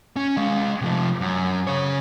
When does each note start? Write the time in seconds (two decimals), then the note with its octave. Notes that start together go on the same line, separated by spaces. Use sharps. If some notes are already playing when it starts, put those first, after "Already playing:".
0.16 C#4
0.37 G#3 F5
0.81 C3 F3
1.21 F#2
1.67 C#3 C#5